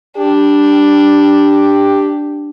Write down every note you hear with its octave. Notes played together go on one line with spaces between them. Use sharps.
D4 G4